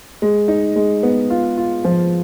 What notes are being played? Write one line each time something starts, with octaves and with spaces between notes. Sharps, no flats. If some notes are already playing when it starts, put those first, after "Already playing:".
G#3
D#4
G#3
B3
F4
F4
F3